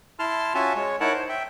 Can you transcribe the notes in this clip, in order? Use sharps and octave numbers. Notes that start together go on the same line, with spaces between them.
E4 A5 C6 F6
C#4 F4 F#4 E5 G#5 A5
G#3 C#5
D#4 E4 A#4 C#5 F#5 A5
C5
E5 G5